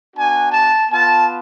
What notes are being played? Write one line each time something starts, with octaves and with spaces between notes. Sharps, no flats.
B3 D4 F#4 G#5
A5
B3 F4 A5